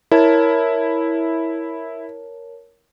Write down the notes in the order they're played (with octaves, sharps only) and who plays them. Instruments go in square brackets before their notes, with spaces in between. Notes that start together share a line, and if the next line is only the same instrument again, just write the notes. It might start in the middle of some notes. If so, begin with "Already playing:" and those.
[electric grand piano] E4 [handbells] A#4 C#5 A5